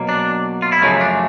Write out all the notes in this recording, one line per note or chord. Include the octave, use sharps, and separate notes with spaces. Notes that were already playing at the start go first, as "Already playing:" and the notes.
Already playing: B2 F#3 A#3
D4
F4
E4
F#2 C#3 F3 A3 D#4
D4